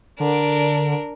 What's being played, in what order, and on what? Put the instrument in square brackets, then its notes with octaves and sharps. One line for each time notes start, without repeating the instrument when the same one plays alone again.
[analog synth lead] D3 [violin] D4 A#4